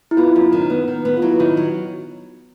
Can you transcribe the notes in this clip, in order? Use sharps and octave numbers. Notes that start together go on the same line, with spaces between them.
E4
B3 F4
F#2
D#3
B3
D#3
B3
F4
F#3 E4
D#3
F#3